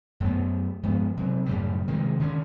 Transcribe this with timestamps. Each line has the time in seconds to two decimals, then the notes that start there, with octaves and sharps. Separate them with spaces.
0.20 F#2 A3 B3
0.83 G2 F3 G#3 B3
1.17 C3 F#3 C4
1.46 F#2 A2 C#3 G3
1.88 C3 D#3 F3 G#3
2.19 D3 D#3 G#3 C#4